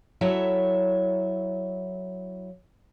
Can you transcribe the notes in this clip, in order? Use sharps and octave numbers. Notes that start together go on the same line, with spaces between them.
F#3 E4 A4 C#5 E5